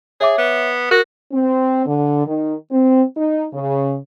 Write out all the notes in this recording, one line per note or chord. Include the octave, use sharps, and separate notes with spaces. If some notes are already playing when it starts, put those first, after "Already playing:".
G#4 C#5 E5 D6
B3
F#4 A#4 A#6
C4
D3
D#3
C4
D#4
C#3